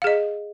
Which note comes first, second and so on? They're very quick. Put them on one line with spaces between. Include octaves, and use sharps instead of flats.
F5 G#4 D#5